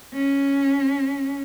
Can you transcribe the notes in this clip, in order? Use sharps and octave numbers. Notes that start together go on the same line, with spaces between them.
C#4